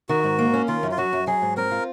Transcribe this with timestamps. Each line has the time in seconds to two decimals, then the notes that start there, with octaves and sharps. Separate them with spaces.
0.09 D#3 F#4
0.24 G#2
0.39 A#3
0.54 C#4
0.68 D#3 F4
0.83 F#2
0.91 F4
0.98 F#3 F#4
1.13 F#2
1.27 F#3 G#4
1.42 G#2
1.57 C4 A#4
1.71 F4